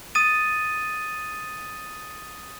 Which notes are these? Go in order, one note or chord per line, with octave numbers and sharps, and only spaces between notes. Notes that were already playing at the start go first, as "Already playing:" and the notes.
D#6 A6 D#7